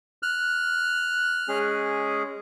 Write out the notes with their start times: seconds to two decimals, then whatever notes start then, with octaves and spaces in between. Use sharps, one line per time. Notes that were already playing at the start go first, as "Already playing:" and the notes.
0.23 F6 F#6
1.48 G#3 C#4 G#4